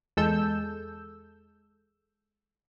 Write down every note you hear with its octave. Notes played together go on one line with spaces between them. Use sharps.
E2 G#3 A4 E6 G6